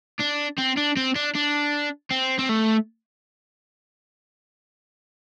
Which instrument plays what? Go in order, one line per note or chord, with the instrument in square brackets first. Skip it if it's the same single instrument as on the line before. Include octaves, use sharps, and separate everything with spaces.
[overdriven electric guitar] D4
C4
D4
C4
D4
D4
C4
C4
A3